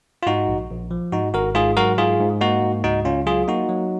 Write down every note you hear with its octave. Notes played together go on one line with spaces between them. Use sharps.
F4
G#2 D#4 F#4
A#1
A#1
F3
G#2 D#4 F#4
G#1 F#4 A#4
G#2 F4 G#4
F#3 F#4 A#4
G#2 F4 G#4
G#2
A#3 D#4 F#4
G#2
C#2 D#4 F#4
C#2 C#4 F4
F#3 F4 G#4
A#3 D#4 F#4
F#3